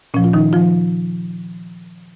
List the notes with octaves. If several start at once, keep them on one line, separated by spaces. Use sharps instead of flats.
A#2 F3 C#4
F4
D#3 D#4
F3 F4